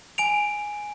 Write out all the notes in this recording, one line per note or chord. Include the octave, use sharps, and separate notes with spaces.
G#5 D7 F7